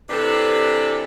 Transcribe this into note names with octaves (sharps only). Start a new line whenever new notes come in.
C3 E3 D4 G4 A4 B4